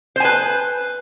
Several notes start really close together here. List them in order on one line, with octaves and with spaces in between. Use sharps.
C5 G#5 B4